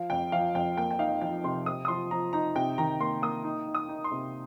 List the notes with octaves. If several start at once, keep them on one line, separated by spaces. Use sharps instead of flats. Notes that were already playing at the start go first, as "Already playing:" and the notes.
Already playing: F3 F5
F2 G5
F3 F5
F2 G5
A#3 G5
G5
D#4 F5
F3 G5
C3 C6
C3 D#6
D#6
F3 C6
F3 A#5
D#4 A#5
C3 G5
D#3 A#5
A#3 C6
A#3 D#6
D#4
D#4
D#6
D#4
C6
C3